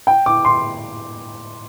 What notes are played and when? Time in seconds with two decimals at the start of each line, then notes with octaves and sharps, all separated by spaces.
0.07 G5
0.26 D6
0.45 C6